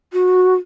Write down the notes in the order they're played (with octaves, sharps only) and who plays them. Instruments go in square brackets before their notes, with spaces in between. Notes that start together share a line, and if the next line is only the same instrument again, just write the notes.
[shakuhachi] F#4